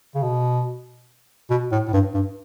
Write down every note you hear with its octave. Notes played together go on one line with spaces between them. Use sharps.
C#3
B2
B2
A2
A2
G2
G2